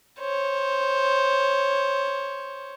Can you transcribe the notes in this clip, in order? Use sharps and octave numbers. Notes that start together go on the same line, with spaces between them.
C5 C#5